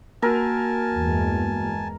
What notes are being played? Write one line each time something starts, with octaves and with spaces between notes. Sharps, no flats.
A#3 F#4 A#4 G#5 A5
E2 G2 G#3